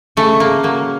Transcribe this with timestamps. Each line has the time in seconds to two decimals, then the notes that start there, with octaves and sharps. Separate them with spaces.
0.17 C#3 A3
0.40 A#3
0.63 F#3 A#3